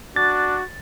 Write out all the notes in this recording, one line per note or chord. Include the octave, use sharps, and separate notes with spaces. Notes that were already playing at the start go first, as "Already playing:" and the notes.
D4 F#4 A6